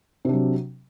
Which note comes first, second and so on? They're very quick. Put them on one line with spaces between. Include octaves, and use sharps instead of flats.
C3 D4 F#3